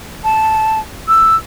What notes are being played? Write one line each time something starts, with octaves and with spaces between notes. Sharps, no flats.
A5
E6